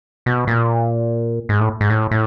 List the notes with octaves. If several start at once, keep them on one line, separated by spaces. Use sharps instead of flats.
B2
A#2
G#2
A2
G#2
A2
A2